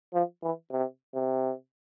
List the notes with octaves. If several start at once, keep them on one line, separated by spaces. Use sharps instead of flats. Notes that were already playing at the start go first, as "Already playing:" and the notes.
F3
E3
C3
C3